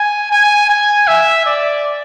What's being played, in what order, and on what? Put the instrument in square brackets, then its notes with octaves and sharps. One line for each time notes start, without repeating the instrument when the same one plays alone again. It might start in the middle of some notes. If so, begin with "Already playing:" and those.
Already playing: [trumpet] G#5
G#5
G#5
E5
D5